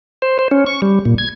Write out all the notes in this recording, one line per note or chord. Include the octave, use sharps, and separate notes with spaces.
C5
C5
C#4
C#6
G3
A#2
G#6